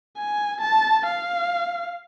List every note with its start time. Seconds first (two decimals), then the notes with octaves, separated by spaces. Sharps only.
0.17 G#5
0.61 A5
1.06 F5